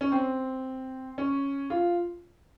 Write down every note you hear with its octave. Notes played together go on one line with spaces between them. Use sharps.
C#4
C4
C#4
F4